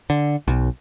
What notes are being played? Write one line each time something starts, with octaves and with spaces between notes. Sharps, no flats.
D3
B1